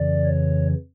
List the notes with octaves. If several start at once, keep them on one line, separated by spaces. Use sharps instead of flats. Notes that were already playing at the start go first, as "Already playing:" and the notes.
Already playing: F2 C#3 E3 D5
C#5